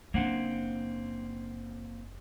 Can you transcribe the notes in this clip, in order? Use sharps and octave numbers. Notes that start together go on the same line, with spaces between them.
F#1 A#3 C4 D4 F#5